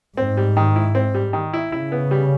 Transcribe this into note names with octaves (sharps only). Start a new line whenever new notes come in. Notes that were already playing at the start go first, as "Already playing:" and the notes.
G#2 C4
G3
D#3
E4
C4
G3
D#3
E4
C#3 E4
B3
G3